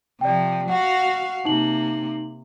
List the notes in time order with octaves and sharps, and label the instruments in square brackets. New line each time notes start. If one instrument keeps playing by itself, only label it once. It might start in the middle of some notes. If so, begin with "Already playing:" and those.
[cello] C3 F3 [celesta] D5 G5
[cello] F#4 F5 [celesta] F#5
[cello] C3 A#3 [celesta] D#4 F#7